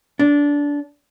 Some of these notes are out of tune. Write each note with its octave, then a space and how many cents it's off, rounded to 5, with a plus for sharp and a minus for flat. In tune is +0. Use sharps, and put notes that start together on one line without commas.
D4 -20